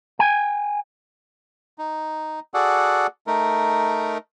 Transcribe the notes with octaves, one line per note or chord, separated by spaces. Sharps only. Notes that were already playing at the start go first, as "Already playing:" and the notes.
G5 G#5
D#4
F#4 G#4 A4 D5 F#5
A3 D#4 A#4